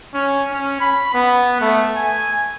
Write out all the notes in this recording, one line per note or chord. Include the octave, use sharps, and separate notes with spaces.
C#4
C#4
B5
B3
A3
G#5